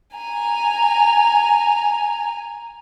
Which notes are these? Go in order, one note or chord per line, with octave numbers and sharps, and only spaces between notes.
G#5 A#5